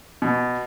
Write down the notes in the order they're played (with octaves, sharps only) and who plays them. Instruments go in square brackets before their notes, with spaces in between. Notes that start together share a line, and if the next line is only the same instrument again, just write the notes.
[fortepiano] B2